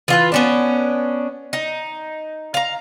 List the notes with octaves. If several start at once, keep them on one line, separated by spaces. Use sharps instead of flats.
E3 F4 B4
B3 C#4 D4
D#4
F5 A#5